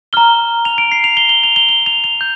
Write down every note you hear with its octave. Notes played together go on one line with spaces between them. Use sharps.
A#5 F6 G7
F7
D7
C7
F7
G7
G7
F7
G7
G7
F7
F7
G6